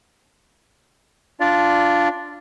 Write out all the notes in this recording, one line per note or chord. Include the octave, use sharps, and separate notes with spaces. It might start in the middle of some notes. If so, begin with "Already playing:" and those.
D4 F4 D5